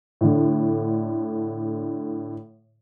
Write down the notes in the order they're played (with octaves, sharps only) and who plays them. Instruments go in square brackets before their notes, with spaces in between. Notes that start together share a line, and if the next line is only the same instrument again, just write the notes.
[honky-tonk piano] A2 D3